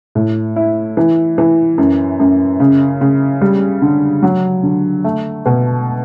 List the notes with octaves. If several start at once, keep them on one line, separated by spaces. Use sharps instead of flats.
A2
E4
E3
E3
F#2
F#2
C#3
C#3
G3
D3
F#3
D3
A3
B2